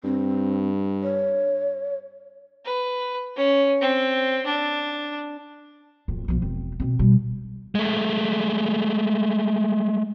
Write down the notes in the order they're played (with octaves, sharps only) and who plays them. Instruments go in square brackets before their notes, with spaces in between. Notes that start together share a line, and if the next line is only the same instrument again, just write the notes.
[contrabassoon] G2 [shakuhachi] C4
[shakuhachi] C#5
[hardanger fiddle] B4
C#4
C4
D4
[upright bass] D1 F2
B1 F3
E1 C4
B2 C4
B2 G3
[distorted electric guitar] G#3 A3